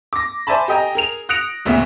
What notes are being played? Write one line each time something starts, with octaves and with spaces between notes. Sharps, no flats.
D6 A#6
C5 D5 E5 G#5 A5 B5
G4 A4 D#5 G5 G#5 A#5
G#4 A#4 F7
D#6 F#6 A#6 C#7 D7 F7
G1 D2 A#2 C#3 B3 E5